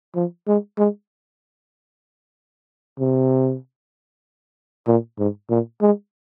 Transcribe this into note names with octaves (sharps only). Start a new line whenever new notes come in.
F3
G#3
G#3
C3
A#2
G#2
A#2
G#3